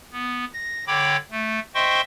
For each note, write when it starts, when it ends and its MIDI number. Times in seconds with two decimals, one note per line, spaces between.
0.12 0.45 59
0.54 0.85 94
0.87 1.16 50
0.87 1.16 73
0.87 1.16 79
0.87 1.16 83
0.87 1.16 86
1.31 1.60 57
1.75 2.01 72
1.75 2.01 75
1.75 2.01 76
1.75 2.01 79
1.75 2.01 84
1.75 2.01 85